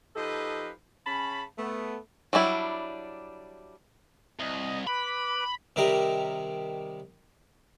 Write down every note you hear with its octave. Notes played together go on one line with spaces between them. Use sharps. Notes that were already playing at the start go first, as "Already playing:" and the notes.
F3 D#4 G4 A4 B4 D#5
C#3 C#4 A5 B5
A3 B3
F#3 G3 D4 E4
C2 D#5
B4 B5 D6
C3 D#3 G3 G4 A#4